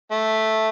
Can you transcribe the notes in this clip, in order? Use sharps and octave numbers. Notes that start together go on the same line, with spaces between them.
A3